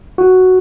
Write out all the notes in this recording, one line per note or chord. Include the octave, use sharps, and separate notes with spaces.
F#4